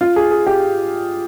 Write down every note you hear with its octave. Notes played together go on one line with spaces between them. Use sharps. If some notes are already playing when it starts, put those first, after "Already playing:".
F4
G#4
G#4
G4